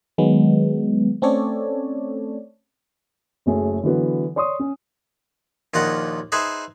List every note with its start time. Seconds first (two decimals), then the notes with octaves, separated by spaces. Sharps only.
0.18 D#3 F#3 G#3 B3
1.22 A3 C4 C#4 A4 C#5 D5
3.46 F#1 F#2 A3 G#4
3.83 D3 E3 F#3 B3
4.36 C#5 D5 C6 C#6 D#6
4.59 C#4
5.74 A#1 D#2 F4 D#5 F#5 A#5
6.32 D#4 G#4 B4 C5 E5 G#5